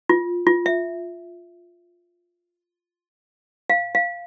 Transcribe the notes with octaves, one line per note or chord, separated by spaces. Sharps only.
F4
F4
E5
F5
F5